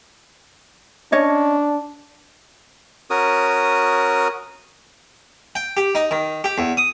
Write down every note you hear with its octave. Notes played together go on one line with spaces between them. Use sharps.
C#4 D4 C#5 D#5
C#4 F#4 A#4 D#6
G5
G4
D#4
D#3
G4
E2
D#6